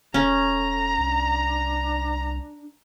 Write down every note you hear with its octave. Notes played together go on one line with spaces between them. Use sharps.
E1 C#4 A4 A#5
C2 D4